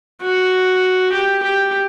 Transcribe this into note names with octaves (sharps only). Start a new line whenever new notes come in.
F#4
G4
G4